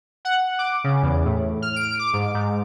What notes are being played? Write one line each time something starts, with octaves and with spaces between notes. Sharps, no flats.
F#5
D6
C#3
E2
A2
F6
D7
D6
G#2
G#2